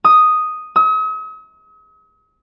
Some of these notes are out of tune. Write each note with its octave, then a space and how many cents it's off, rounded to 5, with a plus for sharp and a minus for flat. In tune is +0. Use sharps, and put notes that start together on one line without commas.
D#6 +0
D#6 +45